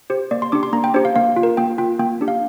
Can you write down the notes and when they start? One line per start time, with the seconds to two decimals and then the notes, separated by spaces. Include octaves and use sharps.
0.10 G4 C5
0.31 A#3 D5
0.42 C6
0.52 D4 G4 D6
0.63 C6
0.73 A#3 A#5
0.84 G5
0.94 D4 G4 C5
1.05 F5
1.15 A#3 F5
1.37 F4
1.43 A#4
1.57 A#3 G5
1.78 F4 G5
1.99 A#3 G5
2.21 D4 G4
2.28 F5